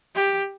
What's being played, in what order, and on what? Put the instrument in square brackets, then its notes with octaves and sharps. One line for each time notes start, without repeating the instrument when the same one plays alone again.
[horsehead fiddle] G4